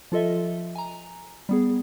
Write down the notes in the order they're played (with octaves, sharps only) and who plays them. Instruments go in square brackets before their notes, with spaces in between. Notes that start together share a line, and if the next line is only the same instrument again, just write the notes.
[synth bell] F3 F4 A4 D#5 E5
G#5 A#5
G3 B3 G#4